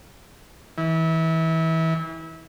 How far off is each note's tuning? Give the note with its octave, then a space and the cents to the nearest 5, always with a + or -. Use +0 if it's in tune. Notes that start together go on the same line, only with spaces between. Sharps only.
E3 -30